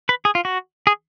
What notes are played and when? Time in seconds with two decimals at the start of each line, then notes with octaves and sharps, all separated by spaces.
0.09 B4
0.25 G#4
0.35 F4
0.45 F#4
0.87 G#4